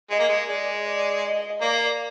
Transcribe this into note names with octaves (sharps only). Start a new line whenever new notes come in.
G#3 D#5
A#3
G#3
G#3 D5
D5
D#5
A#3 D5